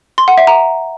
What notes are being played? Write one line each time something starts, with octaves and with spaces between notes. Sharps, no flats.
C6
F#5
E5
A#5